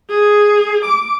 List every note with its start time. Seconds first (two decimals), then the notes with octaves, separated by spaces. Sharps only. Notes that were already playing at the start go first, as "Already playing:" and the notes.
0.10 G#4
0.85 D6